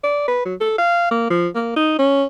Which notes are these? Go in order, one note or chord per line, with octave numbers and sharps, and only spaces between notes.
D5
B4
F#3
A4
F5
A#3
F3
A#3
D#4
C#4